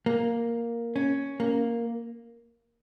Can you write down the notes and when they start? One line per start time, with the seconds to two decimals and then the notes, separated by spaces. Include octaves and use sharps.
0.06 A#3
0.96 C#4
1.40 A#3